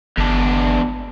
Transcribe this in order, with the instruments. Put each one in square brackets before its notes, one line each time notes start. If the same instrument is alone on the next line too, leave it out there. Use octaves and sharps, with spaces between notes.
[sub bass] G1 [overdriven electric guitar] E2 D4